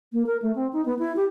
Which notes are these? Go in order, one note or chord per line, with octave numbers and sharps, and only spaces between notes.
A#3
A#4
A3
C4
D#4
B3
E4
G4